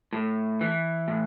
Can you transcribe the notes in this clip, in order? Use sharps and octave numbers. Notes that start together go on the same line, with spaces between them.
A2
E3
A2